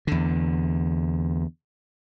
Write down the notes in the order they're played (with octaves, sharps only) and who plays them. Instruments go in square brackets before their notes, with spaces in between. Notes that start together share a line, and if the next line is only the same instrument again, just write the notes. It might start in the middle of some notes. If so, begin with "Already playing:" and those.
[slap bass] E2 D3